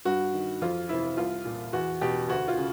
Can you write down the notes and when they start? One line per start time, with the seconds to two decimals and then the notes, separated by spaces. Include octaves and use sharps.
0.05 G2 F#4
0.33 D#3
0.61 F2 F4
0.89 C3 E3 E4
1.17 C2 F4
1.45 A#2
1.73 E2 F#4
2.01 B2 G4
2.29 D2 F#4
2.48 F4
2.57 C#3